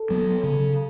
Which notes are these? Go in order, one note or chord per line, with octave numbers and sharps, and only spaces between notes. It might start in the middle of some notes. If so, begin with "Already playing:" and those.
Already playing: A4
F#3 B3
C#3